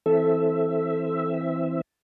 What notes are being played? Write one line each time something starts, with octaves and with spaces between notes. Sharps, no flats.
E3 C4 A4 E5